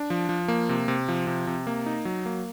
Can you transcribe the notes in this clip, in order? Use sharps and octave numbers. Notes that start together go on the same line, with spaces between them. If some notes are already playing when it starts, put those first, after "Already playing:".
Already playing: D4
F3
F3
A#3
C3
C3
F3
C3
C3
A#3
D#4
F#3
A#3